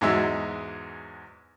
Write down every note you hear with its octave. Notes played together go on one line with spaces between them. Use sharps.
E2 G#2 F#3 G#3 E5 E6